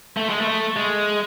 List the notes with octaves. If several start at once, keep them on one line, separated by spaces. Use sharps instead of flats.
A3
G#3
A3
G#3